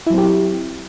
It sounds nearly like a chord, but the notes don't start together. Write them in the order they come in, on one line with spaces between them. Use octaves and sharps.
E4 F#3 C4 G4